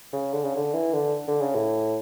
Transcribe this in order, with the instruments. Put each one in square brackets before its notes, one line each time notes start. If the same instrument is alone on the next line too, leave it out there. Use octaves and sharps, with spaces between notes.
[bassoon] C#3
D3
C#3
D3
E3
D3
D3
C#3
A2